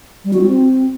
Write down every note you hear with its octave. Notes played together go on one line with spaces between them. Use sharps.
G3
F#4
C4